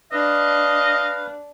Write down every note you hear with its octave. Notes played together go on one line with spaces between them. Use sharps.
D4 B4 D#5 F5